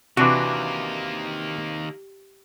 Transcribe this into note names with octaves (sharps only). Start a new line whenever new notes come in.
C3 D#3 E3 A#3 D4 F#4